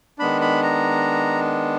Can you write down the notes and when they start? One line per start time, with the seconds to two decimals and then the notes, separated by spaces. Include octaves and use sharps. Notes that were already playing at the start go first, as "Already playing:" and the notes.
0.19 D#3 G#3 B3 D4 B5
0.41 B5
0.63 A#5